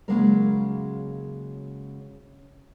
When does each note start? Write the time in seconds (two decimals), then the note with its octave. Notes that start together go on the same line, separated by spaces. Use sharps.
0.08 C#3 F#3 G#3 A#3 C#4 A#4